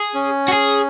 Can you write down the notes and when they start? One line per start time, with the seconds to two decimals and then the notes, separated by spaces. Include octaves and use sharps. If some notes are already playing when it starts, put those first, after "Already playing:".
Already playing: G#4
0.14 C#4
0.48 F#4
0.53 G#4